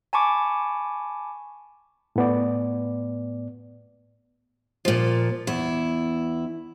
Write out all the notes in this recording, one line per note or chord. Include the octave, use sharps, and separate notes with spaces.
G#5 A5 B5 C#6 D6
A2 B3 D5
A#2 F3
E2 E4